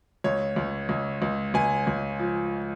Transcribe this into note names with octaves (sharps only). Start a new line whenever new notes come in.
C#2 C#5
C#2
C#2
C#2
C#2 G#5
C#2
F3